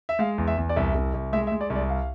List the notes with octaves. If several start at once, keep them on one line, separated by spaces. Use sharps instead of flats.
E5
G#3 F5
E2
E5
E2
D5
C2 E5
C2
C2
G#3 E5
E5
G#3
D5
C2
D5
F5